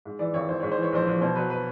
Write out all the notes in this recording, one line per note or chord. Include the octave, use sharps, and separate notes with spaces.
G#2
E3 D5
G#1 C#5
G#1 C5
G#2 C#5
C5
E3
C#5
A#1 C5
A#1
B2 C5
F#3 B4
B4